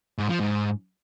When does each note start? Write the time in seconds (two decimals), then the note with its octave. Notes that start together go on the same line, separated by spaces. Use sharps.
0.18 G#2
0.29 F3
0.40 G#2